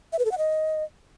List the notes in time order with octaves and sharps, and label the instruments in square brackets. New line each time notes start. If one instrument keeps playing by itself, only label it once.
[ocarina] E5
B4
A4
F#5
D#5